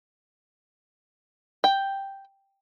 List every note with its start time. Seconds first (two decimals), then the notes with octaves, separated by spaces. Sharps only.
1.64 G5